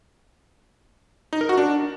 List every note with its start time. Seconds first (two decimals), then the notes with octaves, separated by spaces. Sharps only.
1.33 D#4
1.41 A#4
1.49 F#4
1.57 D4